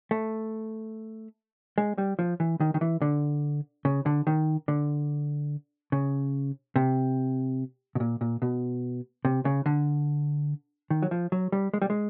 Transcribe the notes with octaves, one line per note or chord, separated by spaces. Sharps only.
A3
G#3
G3
F3
E3
D#3
D#3
E3
D3
C#3
D3
D#3
D3
C#3
C3
B2
A#2
A#2
B2
C3
C#3
D3
D#3
F#3
F3
F#3
G3
G#3
G3
G#3